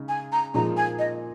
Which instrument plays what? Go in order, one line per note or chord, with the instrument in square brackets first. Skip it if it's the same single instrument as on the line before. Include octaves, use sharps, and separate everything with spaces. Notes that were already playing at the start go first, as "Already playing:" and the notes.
Already playing: [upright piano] C#3 G#3 D#4
[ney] G#5
A#5
[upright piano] A#2 F3 G#3 D#4 [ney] A#5
[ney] G#5
D#5